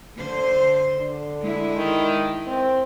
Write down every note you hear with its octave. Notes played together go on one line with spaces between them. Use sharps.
D3 C5
D3
G#3 E4
D#3
C4